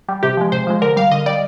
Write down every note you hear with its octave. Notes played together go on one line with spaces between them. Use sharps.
G3
C3 G4
F3 G#3
C3 C5
F3 G#3
D3 A#4
G3 F5
D3 D#5
G3 D5